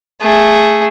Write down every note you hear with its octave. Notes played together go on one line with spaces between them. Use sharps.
A3 G#4